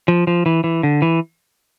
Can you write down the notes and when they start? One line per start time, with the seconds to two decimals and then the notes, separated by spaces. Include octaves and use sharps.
0.08 F3
0.27 F3
0.46 E3
0.64 E3
0.83 D3
1.02 E3